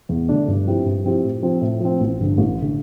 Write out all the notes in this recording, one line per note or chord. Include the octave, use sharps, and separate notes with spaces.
E2
D3 A3 D4
G2
F3 C4 E4 G4
G2
F3 C4 E4 G4
A2
F3 C4
A2
F3 C4
A1
G2 D3
A1
D3